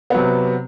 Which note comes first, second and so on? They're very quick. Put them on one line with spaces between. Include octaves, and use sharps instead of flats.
B3 F#3 C3